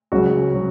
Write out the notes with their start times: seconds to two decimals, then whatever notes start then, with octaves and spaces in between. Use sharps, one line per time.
0.12 C#2 C#3 F#3 F#4
0.54 C#3 F#3